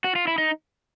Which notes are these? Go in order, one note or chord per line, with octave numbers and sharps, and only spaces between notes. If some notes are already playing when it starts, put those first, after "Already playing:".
F#4
F4
E4
D#4